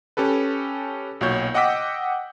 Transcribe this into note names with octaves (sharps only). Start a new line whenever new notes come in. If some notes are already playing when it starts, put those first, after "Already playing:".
C#4 G4 A4 B4
B1 A#2 F#4 C#5 G6
D#5 F#5 G5 D6 E6 B6